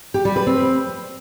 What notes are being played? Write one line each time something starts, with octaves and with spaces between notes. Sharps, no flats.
G4
G3
B4
C4